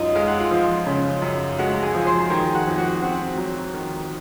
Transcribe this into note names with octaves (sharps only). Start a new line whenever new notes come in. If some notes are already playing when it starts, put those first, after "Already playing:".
Already playing: F#2 D#4 F4 D#5
G#3 F5
F#5
F4 F5
F3
C#3
F#2
G#3 F#4 F#5
A#5
G#4 G#5
F3
C5 C6
A#5
D#3 G#4 G#5
F#4 F#5
F2
F#4 F#5
C4 F#4 F#5
F#3
D#3